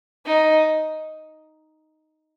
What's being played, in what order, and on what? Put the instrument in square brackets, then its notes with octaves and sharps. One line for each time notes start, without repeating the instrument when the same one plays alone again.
[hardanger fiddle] D#4